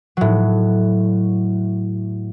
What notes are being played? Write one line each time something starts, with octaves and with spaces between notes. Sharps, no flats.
A2 F#3